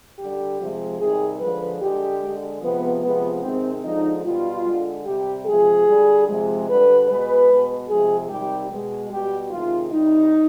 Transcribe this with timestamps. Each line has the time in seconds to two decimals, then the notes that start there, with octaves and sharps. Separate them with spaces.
0.18 D3 G3 G4
0.59 C3 F3 G#3
0.99 C3 D#3 G3 G#4
1.40 D3 F3 G#3 B4
1.80 D3 G#3 G4
2.22 D3 G#3
2.62 C3 F3 G#3 B3
3.02 C3 F3 G#3 B3
3.43 C3 D#3 G#3 C4
3.83 D3 F3 G#3 D#4
4.24 B2 G3 F4
4.64 D3 G#3
5.05 C3 G3 G4
5.46 C3 F3 G#3 G#4
5.86 D3 G3
6.27 C3 F3 G#3
6.67 D3 G3 B4
7.08 B2 G#3 B4
7.48 B2 G#3
7.88 C3 F3 G#3 G#4
8.29 C3 D#3 G3 G4
8.70 B2 G#3
9.10 B2 G3 G4
9.51 C3 D#3 G#3 F4
9.91 C3 G3 D#4